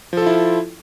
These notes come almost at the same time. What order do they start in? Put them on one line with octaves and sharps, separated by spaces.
F3 A4 F4 E4